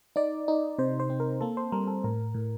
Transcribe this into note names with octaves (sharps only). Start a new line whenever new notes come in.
D#4 D5
D#4
C3 C5
C5
C4
A#4
A#3 A4
C5
G3 A#4
A4
A2 A#4
A2